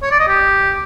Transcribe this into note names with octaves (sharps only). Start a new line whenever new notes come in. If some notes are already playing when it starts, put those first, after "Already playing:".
C#5
D5
D#5
G4